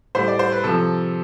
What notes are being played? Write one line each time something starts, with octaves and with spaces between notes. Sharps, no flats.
A2 G3 C5
D5
C5
B4
C3 F3 A4